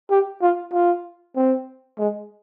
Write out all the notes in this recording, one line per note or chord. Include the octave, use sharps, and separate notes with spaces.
G4
F4
F4
C4
G#3